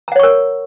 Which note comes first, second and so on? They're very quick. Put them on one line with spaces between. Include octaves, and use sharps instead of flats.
A#5 F#5 C#5 C#6 A#4